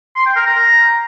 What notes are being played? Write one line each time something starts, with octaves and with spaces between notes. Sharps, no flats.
C6
G5
A#4
A#5